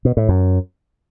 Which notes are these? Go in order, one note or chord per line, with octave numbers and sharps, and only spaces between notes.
B2
A2
F#2